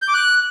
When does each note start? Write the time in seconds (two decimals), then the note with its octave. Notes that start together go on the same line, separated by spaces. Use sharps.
0.02 G6
0.08 D6
0.14 F#6